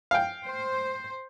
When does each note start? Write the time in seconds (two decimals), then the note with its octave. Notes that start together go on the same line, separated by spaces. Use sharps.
0.11 F5 G5
0.44 C5